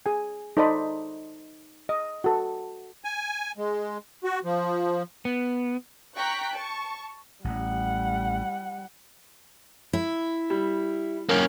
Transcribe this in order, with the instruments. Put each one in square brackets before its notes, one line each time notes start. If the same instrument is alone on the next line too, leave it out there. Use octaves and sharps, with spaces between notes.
[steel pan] G#4 G#5
D#4 A4 C5 D5 D#5 B5
D#5
F#4 A4
[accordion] G#5
G#3
F#4
F3
[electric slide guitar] B3
[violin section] G5 A#5 C#6 F#6 B6
A5 C#6
[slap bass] A1 [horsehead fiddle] G3 F#5
[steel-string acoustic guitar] E4
[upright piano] G3
[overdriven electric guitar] A#3 C#4 [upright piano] A#4